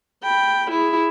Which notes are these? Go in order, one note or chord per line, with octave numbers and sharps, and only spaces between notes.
G5 B5
E4 G#4